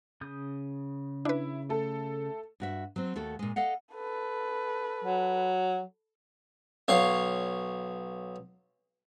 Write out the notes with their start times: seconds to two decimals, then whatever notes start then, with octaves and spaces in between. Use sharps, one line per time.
0.21 C#3 D#6 G6
1.25 D4 E4 B4
1.69 A3 A4
2.60 G2 F#4 E5
2.96 F#3 C4
3.15 D#2 A3 F#4 A4
3.39 A#2 G#3
3.56 A4 D#5 F5 F#5
3.94 A4 B4
5.04 F#3
6.88 B1 C#5 F5